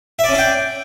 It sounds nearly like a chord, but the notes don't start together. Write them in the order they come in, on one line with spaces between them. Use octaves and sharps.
E5 D5 C#4 D4 G5